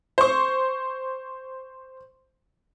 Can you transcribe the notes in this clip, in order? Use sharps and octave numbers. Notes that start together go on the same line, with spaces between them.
C5 C#6